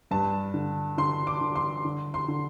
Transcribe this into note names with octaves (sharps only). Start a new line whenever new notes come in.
G2 A5
D3
D3 C6
D6
D3
C6
D3
C6
D3